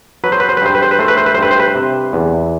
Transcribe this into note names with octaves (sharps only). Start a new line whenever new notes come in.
F#3 B4
C5
B4
C5
B4
G2 C5
B4
C5
B4
A3 C5
B4
C5
B4
C5
G2 B4
C5
B4
C3
E2